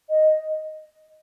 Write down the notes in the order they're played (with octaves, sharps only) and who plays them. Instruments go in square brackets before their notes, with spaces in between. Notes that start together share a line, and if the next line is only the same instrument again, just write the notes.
[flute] D#5